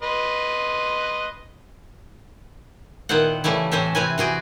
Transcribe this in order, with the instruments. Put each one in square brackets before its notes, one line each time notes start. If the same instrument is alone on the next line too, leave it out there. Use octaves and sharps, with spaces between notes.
[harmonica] B4 D#5 C6
[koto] A#2 D#3 B3 E4 C5 F#5
C#3 E3 G3 A3 E4
A2 E3 C4 C#4 C5 E5
C3 C4 E4 B4 G#5
E3 F#4 G#4 G5